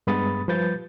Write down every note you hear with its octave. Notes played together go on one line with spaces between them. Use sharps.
G2 G#3 B3 B5 D#6 A6
F3 G3 B4 G6 A6